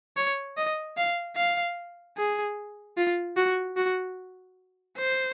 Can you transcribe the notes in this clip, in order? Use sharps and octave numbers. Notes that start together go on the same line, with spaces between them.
C#5
D#5
F5
F5
G#4
F4
F#4
F#4
C5